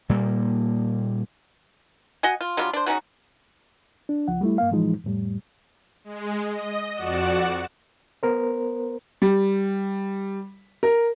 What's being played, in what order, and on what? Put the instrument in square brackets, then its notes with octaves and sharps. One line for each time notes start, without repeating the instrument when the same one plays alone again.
[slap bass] A#2 G3 A#3
[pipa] F#4 D#5 F#5 G#5
F4
F#3 G3 D4 F4
D4 C5
C#3 C#4 D#4 F#4
[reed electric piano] D4
C#2 F3 F#5
G3 A3 E4
G2 A#3 F5
A2 E3 F3 G#3 D#4
F2 A2 G3
[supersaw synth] G#3
D#5
F2 F#4 D5 F#5 E7
[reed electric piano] B3 A#4 C5
[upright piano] G3
A#4